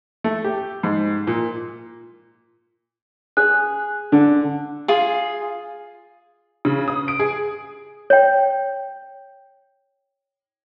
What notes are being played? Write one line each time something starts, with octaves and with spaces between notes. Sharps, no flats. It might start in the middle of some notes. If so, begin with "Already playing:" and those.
A3
G4
G#2
A#2
G#4 F#6
D3
F4 G#4
C#3
D#6
D7
G#4
C#5 G5